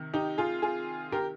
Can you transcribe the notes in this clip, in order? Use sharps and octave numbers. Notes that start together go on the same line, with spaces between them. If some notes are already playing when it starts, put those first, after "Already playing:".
Already playing: C3 D#3
D#4 G4
F4 G#4
F4 G#4
G4 A#4